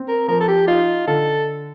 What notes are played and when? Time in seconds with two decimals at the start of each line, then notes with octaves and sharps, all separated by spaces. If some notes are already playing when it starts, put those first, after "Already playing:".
Already playing: C4
0.09 A#4
0.28 F3 A#4
0.41 A4
0.48 G4
0.68 D#4 F4
1.07 D3 A4